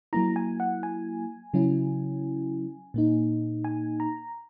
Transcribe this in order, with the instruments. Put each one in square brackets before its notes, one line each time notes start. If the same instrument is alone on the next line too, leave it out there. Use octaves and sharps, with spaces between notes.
[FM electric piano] F#3 A#3 E4 A#5
G#5
F#5
G#5
C#3 F#3 C#4 E4
A#2 A#3 D#4
G#5
A#5